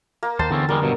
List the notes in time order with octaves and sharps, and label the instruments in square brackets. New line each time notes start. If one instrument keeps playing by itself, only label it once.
[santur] A#3
[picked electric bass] D#2 [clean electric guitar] C5 [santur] A5
[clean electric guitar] E2 C4 C#4 [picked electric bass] D3
[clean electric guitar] E2 G3 G#3 [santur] A#4
[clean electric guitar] G2 B2 F#3